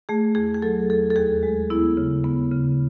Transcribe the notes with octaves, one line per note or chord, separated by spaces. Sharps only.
A3 G#4
E2 G#4
G#4
F#3 A4
E2 A4
A4
D#2 G#4
G#3
B3 E4
C#3
B3
C#3